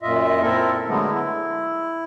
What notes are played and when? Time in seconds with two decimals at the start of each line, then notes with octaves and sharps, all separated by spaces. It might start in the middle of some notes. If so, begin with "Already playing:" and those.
0.03 F#2 A#2 F4 D#5 E5
0.42 C4 E4 A4 A#4
0.88 D3 F#3 G#3 A3 B3
1.11 E4